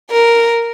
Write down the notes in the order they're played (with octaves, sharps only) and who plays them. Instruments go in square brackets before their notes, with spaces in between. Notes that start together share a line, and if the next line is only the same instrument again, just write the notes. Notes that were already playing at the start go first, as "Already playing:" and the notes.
[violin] A#4